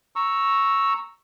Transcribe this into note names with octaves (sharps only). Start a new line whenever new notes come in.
A#5 C#6 E6